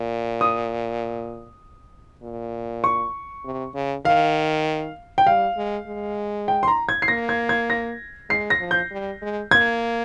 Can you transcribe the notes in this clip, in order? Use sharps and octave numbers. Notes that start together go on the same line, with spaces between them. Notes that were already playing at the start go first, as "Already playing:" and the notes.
Already playing: A#2
D#6
A#2
C#6
C3
C#3
D#3 F5
G5
G3 F5
G#3
G#3
G5
C6
A#5
G#6
C7
A#3 A#6
G#6
G#6
A#6
G#3 C7
A#6
F3
G6
G3
G#3
A#3 G#6